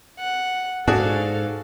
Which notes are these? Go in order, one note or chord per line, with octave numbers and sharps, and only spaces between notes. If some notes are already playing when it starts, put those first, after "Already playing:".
F#5
G#2 D4 F#4 G#4 A4 F5